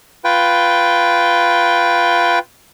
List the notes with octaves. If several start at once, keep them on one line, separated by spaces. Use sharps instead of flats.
F4 B4 G5